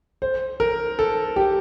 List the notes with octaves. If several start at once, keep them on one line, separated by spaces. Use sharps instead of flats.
C5
A#4
A4
G4